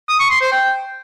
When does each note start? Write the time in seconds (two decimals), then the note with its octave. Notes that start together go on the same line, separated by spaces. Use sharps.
0.09 D#6
0.19 C#6
0.30 C6
0.41 C5
0.52 G5